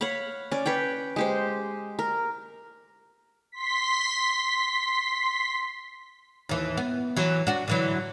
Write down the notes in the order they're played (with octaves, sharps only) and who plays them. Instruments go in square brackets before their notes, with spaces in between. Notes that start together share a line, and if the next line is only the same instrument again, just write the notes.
[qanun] C#5 F5 F#5 B5
C#4 D5
B4 C#5 G5
G#3 G4 C5
A#4
[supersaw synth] C6 B6
[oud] D#2 E3
B3
E3 F#3
D4 F#4
D3 E3 F#3